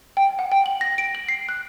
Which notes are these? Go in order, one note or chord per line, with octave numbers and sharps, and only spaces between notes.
G5
F#5
G5
F#7
A#6
D7
F#7
C7
F#6